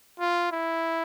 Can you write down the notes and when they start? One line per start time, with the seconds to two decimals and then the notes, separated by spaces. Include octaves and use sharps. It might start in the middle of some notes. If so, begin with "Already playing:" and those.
0.20 F4
0.52 E4